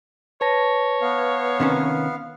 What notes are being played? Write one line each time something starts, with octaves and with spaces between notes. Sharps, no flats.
B4 C#5 A5 A#6
B3 F5
C3 D#3 C#4